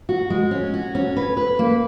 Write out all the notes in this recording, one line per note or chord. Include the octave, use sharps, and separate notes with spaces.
F#4
G#3
C#4
F#4
C#4
B4
B4
A#3